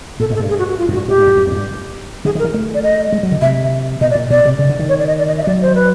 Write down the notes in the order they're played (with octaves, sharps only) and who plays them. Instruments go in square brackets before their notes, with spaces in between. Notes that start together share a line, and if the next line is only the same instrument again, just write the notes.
[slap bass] A#2 [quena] A4
[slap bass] G#2
[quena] A4
[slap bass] G2
[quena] G#4
F#4
F#4
F4
[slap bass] F#2
[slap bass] G2 [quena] F#4
[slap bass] G#2 [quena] G4
[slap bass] G2
F#2
F2
F2
G#2
G2
[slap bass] D3 [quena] G#4
[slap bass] D#3
[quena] A#4
[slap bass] E3
A3
[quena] D5
D#5
[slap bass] G#3
F#3
D3
[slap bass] C3 [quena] E5
[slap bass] B2 [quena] D#5
[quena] D5
[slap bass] A#2
[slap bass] B2 [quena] D5
[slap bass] C3
C#3
D3
D#3
[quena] C#5
D5
D#5
D5
D#5
E5
D#5
[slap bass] F#3 [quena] D5
[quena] C5
B4